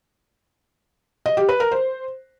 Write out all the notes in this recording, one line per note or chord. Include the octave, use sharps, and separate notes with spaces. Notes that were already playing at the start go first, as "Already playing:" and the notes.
D#5
G4
B4
A#4
C5